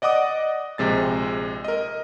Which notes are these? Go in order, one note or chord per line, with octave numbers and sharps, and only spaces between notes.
D5 D#5 F#5 D6 D#6
A#1 C3 G#3 A6
A#4 D#5